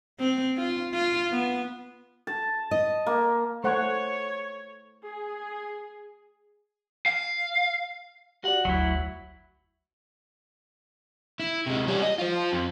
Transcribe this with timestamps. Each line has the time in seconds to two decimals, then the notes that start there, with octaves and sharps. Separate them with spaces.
0.19 C4
0.57 F4
0.94 F4
1.31 B3
2.27 A5
2.71 D#5
3.06 A#3
3.64 A3 C5 C#5 F#5
5.04 G#4
7.06 F5
8.44 F#4 G4 D5 F#5
8.65 G1 D2 F#3 E4
11.40 E4
11.67 C3 G#3
11.88 G3 C#4
12.03 D#5
12.19 F4 C5
12.53 F2